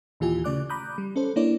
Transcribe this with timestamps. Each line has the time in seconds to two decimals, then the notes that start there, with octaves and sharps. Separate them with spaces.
0.20 D#2 A#2 E3 F4 G4 G#5
0.44 C#3 A3 D5 D6 F#6
0.70 A#5 B5 D6 D#6 F#6 G6
0.98 G3
1.16 C#4 A4 C5
1.36 A#3 D4 E4 C#5 D5